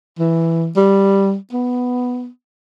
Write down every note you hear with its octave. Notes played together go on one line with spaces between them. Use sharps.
E3
G3
B3